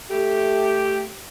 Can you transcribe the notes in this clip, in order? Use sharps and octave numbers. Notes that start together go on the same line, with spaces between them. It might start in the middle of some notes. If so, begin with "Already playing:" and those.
A3 G4